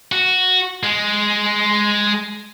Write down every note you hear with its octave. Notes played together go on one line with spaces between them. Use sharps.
F#4
G#3